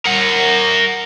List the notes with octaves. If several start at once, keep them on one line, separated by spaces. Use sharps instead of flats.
A#4 F#5